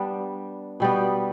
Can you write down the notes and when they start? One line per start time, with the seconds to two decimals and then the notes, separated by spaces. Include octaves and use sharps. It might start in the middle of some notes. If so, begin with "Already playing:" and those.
Already playing: G3 B3 D4
0.80 B2 G3 B3